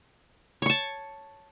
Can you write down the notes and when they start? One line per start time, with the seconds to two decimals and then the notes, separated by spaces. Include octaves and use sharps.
0.62 C#5
0.66 C#6
0.70 A5